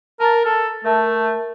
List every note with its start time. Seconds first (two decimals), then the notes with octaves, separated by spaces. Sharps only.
0.20 A#4 A5 A#5 A6
0.46 A4 A5
0.84 A3 A#4 E5 A5